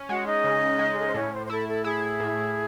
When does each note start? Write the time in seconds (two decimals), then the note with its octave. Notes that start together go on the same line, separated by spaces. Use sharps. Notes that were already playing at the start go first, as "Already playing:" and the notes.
Already playing: C#4
0.09 G#3 F#4 F#5
0.26 D#4 D#5
0.44 C#3
0.79 G#3
0.90 G#4
0.99 A4
1.06 C5
1.14 A2 C#4 C#5
1.32 C5
1.44 C5
1.49 E4 A4
1.67 A4
1.84 E4 G#4
2.20 A2